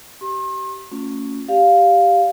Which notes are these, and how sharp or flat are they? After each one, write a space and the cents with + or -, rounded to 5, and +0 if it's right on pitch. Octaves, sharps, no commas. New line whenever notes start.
G4 -30 C6 +40
A3 +35 C#4 +0 F4 +35
G4 +0 D5 +0 F5 +0